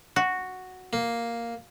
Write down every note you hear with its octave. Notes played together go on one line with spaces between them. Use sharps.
F#4
A#3